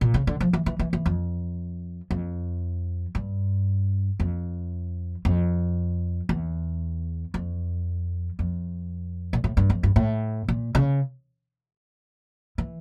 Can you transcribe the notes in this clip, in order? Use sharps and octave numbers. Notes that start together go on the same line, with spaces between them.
A#2
C#3
D3
F3
E3
E3
E3
E3
F2
F2
G2
F2
F2
E2
F2
F2
A#2
A2
G2
F2
G2
A2
A#2
C#3
E3